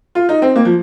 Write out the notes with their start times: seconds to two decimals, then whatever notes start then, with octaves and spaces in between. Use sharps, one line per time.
0.15 F4
0.29 D#4
0.42 C4
0.56 A#3
0.65 F3